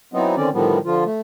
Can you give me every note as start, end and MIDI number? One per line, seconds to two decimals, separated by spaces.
0.14 0.36 52
0.14 0.36 54
0.14 0.36 59
0.14 0.36 60
0.14 0.36 63
0.36 0.49 50
0.36 0.49 51
0.36 0.49 60
0.36 0.49 61
0.36 0.49 74
0.53 0.79 45
0.53 0.79 50
0.53 0.79 51
0.53 0.79 53
0.53 0.79 55
0.53 0.79 59
0.85 1.04 50
0.85 1.04 53
0.85 1.04 65
1.06 1.21 57